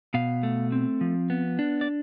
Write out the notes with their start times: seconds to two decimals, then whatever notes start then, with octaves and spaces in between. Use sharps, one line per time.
0.14 B2 F5
0.43 A3
0.72 C4
1.01 F3
1.30 B3
1.59 D4
1.81 D5